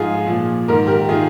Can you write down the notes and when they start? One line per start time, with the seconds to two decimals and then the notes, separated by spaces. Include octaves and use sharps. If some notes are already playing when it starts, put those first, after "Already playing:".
Already playing: G#2 F3 F4 G#4
0.27 A#2 F3
0.68 G#2 D#3 A#4
0.87 G4 A#4
1.09 D#3 F4 G#4